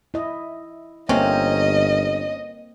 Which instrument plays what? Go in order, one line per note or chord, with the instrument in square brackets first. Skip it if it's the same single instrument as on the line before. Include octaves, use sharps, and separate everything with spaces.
[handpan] E4 D#5
[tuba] G1 [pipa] C3 C#4 [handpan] A#3 C4 [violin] D#5